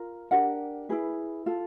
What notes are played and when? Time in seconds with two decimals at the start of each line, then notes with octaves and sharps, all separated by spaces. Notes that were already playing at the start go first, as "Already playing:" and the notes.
Already playing: F4 A#4
0.31 D4 G4 A#4 F#5
0.89 E4 G#4 B4
1.46 F4 A4